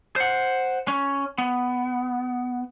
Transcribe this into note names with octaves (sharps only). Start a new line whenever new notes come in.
C5 F#5
C#4
B3